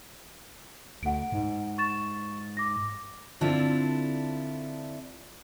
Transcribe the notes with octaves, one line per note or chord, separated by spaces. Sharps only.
D2 F#5 D7
G#2
C#6 A6 E7
D6 A#6
D3 C4 D4 E4 F4